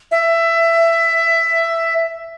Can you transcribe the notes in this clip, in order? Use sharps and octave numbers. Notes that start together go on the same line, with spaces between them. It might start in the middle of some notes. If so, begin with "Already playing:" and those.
E5